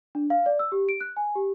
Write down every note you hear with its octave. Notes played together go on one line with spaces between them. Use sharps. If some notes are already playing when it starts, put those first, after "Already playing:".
D4
F5
D5
E6
G4
D7
F#6
G#5
G4